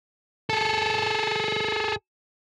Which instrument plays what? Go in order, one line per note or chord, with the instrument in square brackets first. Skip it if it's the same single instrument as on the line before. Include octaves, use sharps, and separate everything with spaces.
[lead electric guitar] G#4 A4